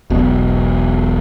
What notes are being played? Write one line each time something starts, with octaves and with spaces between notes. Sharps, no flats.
E1 B1 B2